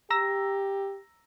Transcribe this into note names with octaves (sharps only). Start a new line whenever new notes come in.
G4 A#5 E6 A#6